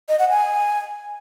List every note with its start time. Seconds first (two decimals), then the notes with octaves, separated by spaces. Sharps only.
0.09 D#5
0.19 F#5
0.30 G#5